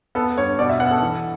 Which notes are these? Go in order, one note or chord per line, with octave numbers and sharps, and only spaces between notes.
B3 A4
G2 C#5
B2 D5
E5
B3 F#5
A4
E3